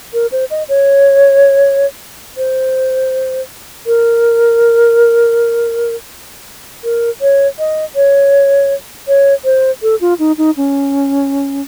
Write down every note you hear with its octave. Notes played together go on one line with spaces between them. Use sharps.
A#4
C5
D#5
C#5
C5
A#4
A#4
C#5
D#5
C#5
C#5
C5
A4
F4
D#4
D#4
C#4